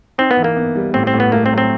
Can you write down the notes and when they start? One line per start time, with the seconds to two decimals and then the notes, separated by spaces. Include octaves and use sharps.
0.18 C4 D#4
0.31 B3
0.37 E3
0.44 A#3
0.57 B3
0.75 G3
0.94 A2 C4
1.07 C4
1.14 A2
1.20 B3
1.32 A3 A#3
1.46 C4
1.52 F#3
1.58 C4